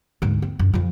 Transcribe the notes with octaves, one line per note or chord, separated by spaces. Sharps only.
D2 G#2
C4
F#2
F2 F3